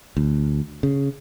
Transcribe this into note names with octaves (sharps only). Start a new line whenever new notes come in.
D2
C#3